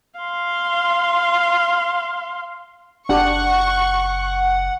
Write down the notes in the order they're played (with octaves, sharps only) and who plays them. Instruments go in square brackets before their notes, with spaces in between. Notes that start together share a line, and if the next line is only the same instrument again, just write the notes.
[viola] F5 C6
[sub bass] F#1 [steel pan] D4 G4 [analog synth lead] F#5 [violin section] C#6